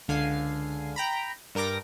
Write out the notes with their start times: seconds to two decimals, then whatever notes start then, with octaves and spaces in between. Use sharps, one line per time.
0.08 C#2 D3 F5 G#5 C7
0.96 G5 A#5 B5
1.55 G2 A#4 G5 D6 A#6